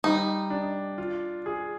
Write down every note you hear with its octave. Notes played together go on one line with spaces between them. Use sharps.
G3 D#4
D4
F4
G#4